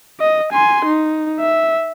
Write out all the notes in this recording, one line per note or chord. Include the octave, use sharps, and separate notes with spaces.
D#5
G#5 C6
D#4
E5